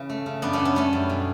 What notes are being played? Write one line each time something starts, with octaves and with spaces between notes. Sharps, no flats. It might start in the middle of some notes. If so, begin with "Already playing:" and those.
Already playing: C#3 E3
A3
C#3
F#2 B3 D4
A3 C#4
F#2
B3
G3 A3 C#4
F#2
B2